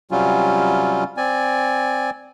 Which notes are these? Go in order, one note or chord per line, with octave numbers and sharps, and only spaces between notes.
C3 F#3 G3 C#4 F4
C4 D5 G#5